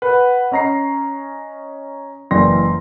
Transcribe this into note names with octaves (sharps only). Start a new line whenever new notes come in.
B4 F#5
C#4 D#5 A#5 A#6 C7
F#1 E3 D5 G5 C6 A#6